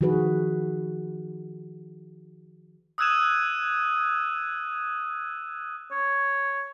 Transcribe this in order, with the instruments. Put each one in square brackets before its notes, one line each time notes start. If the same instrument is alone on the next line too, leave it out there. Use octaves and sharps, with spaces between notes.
[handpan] D#3 F3 F#4 G#4 B4
[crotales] D#6 E6 F#6 G#6 D#7 E7
[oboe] C#5